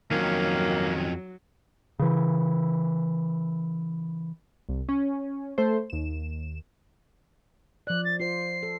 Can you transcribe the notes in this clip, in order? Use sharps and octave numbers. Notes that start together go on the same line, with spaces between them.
F2 D#3 F#3 A#3 C#4
C#3 E3
C2
C#4
A3 A4 C5
D#2 E7
F3 D5 F#6
A6
F4 C5 C7
A4